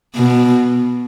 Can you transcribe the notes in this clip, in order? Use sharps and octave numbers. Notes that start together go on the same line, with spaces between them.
B2